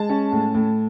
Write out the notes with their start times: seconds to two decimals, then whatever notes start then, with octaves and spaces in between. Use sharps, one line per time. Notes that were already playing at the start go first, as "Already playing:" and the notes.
Already playing: G#3 A5
0.09 C#4
0.32 A2
0.54 A2